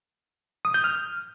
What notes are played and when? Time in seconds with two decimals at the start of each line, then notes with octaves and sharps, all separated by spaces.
0.65 D#6
0.74 G6
0.84 F6